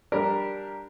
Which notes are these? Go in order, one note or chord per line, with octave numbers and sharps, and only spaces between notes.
G3 D4 G4 A#4